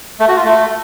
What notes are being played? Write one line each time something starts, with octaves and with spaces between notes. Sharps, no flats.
A3
F#4
F4
A3